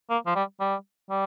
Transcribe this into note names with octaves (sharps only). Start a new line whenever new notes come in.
A#3
F3
G3
G3
G3